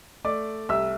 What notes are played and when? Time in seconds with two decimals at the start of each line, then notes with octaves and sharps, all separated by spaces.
0.24 A3 D5 D6
0.69 C2 E5 E6